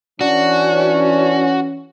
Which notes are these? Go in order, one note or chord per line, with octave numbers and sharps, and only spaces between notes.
E3 C#4 D4 F#4